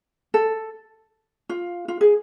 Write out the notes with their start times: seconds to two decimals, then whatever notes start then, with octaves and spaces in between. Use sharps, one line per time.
0.34 A4
1.49 F4
1.88 F4
2.01 G#4